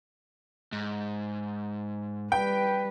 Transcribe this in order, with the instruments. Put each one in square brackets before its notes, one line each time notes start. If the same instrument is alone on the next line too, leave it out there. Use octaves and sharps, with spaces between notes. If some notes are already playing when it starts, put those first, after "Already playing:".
[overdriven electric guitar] G#2
[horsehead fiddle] G3 B4 [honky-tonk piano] G5